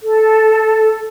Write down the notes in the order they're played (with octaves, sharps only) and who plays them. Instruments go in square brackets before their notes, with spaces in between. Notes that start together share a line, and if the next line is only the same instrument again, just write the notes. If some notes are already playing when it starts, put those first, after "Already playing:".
[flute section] A4